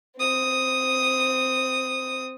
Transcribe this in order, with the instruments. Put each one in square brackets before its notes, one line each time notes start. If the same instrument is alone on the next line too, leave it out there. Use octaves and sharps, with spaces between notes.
[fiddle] C4 D#6